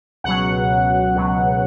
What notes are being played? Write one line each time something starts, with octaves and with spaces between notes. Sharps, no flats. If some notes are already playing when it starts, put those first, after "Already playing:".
C#2 B2 F#3 F#5
C#2 B2 F#3